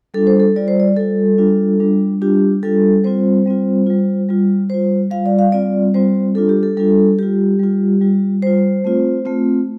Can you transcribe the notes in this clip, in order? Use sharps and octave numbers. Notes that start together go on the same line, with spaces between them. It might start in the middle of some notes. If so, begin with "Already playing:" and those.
G3 D4 F4 A4
C5
A4
G3 F4 D5
C5
D5
G3 F4 A4
G3 D4 F4
G3 D4 F4
G3 D4 F4 G4
G3 D4 F4 A4
G3 C4 F4 C5
G3 C4 F4
G3 F4
G3 F4
G3 F4 C5
G3 F4 F5
D5
F5
G3 C4 F4 D5
G3 C4 F4 C5
G3 D4 F4 A4
G4
A4
G3 D4 F4 A4
G3 F4 G4
G3 F4
G3 F4
G3 F4 C5
A3 C4 F4
A3 C4 F4